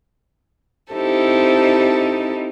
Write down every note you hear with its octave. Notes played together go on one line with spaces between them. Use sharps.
C4 D#4 E4 G4 A4 C5